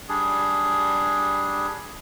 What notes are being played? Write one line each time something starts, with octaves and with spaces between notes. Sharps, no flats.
G3 D4 G#4